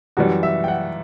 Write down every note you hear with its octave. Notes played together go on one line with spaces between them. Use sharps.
F#2 E3 G3 F#4
E5
G5
F#5